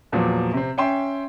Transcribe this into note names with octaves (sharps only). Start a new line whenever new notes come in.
E2 A#2 F3 F#3
C3 C4
C#4 E5 G5 C6